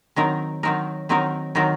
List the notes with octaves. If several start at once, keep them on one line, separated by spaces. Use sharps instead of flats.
D#3 F#3 C4 D#4 A#4
D#3 F#3 C4 D#4 A#4
D#3 F#3 C4 D#4 A#4
D#3 F#3 C4 D#4 A#4